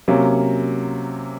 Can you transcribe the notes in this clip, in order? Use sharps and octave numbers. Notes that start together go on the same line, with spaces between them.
C3 F#3 A#3 C#4